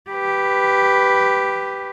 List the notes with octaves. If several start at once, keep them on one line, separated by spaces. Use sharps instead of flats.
G4 B4